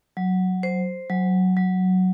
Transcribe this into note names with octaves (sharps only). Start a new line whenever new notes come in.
F#3
C5
F#3
F#3